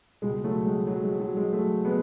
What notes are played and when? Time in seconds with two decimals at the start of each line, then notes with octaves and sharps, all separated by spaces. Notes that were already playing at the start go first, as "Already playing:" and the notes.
0.22 C#2 B2 G#3
0.44 F#3 A3
0.66 G#3
0.87 F#3
1.04 G#3
1.20 F#3
1.37 G#3
1.53 F#3 A3
1.85 G#3 B3